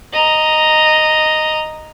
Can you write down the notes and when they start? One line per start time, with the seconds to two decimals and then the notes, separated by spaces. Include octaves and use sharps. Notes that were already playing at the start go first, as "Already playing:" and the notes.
0.13 D#5 A#5